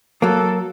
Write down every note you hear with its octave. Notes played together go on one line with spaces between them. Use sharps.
F#3 A#3 A4